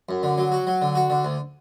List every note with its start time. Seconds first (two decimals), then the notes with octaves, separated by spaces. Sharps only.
0.09 F#2
0.23 D3
0.38 F#3
0.52 F#4
0.67 F#3
0.82 D3
0.95 F#4
1.10 D3
1.25 D2